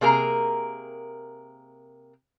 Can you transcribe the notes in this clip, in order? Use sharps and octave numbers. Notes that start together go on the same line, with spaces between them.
C3 A#3 G#4 A#4 A#5